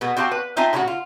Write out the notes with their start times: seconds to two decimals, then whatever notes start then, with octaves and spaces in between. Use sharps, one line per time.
0.01 B2 B3 G#4
0.17 C4 F#4 G4 F5 A5
0.31 B4
0.57 C4 D#4 F4 E5 G#5 A5
0.73 A2 C#3 C#4 D#4 F#4
0.87 F4